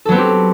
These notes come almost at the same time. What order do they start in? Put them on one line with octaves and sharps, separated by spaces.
A4 F#3 B3 C4 G4